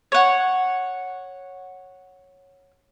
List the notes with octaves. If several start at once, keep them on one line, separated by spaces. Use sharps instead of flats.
C#5 F#5